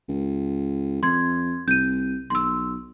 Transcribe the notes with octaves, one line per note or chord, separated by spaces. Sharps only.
C#2
F2 C6 G#6
C2 G6 D#7
B1 C6 E6